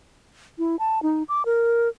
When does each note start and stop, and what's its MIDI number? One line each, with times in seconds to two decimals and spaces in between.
0.59 0.76 64
0.79 1.02 81
1.03 1.23 63
1.29 1.43 86
1.46 1.89 70